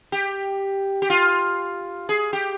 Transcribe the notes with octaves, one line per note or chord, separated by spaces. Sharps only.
G4
G4
F4
G#4
G4